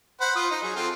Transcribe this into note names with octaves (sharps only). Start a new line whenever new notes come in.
C5 F#5 B5
F4 D#6
D#4
F#3 G#4
C4 F4 A4